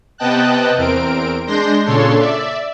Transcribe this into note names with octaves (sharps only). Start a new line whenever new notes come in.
C3 B3 D#5 G5 A5 F#6
E2 C4 A#4 D7
G#3 D4 C6 G6 A#6
A#2 C#3 D4 A4 C#5 C6
D5 E5